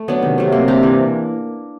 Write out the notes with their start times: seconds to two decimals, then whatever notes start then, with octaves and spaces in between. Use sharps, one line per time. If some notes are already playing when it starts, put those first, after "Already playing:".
Already playing: A3
0.08 F#3 B3 D4
0.22 C3 D#3
0.38 F#3 A3
0.52 A#3
0.68 D4 G4 A#4
0.83 E3